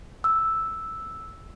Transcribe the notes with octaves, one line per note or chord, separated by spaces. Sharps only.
E6